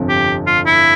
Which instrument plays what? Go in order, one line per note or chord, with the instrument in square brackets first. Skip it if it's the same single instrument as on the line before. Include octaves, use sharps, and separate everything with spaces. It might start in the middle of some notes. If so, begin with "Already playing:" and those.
Already playing: [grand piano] G1 F2 C3 F3
[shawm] G4
F4
E4